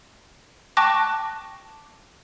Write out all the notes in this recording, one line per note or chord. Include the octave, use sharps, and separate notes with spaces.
G5 A5 C#6 D6 F#6 A#6